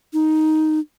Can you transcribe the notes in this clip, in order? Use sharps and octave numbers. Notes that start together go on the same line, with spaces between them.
D#4